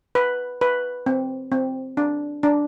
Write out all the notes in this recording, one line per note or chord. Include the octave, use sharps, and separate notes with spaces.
B4
B4
C4
C4
D4
D4